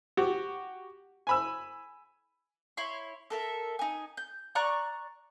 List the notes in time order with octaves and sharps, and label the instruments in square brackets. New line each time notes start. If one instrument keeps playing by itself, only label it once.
[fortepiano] F#4 G4
G#5 B5 E6
[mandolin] E4 C#5 C6
A4 A#4 E5
D#4 G#5
G6
D5 A#5 C#6 F#6